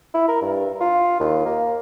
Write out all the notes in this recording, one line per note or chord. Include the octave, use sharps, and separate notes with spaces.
E4
A#4
G2
F4
D#2
A#3